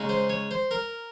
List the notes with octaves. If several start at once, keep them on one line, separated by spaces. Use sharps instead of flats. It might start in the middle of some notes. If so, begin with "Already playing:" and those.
Already playing: C#3 G#3 D#4
C5
C#5
C5
A#4